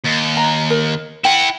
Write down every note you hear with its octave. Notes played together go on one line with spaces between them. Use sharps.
D#2
A#5
A#4
E4 F#5 G5